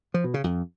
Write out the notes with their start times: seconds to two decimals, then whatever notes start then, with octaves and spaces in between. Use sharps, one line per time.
0.14 F3
0.24 B2
0.34 C#3
0.44 F2